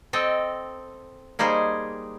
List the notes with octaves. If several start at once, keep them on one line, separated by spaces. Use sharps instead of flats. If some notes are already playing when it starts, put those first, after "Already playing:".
C4 A4 D#5 G5
G3 A#3 D#4 G#4 C5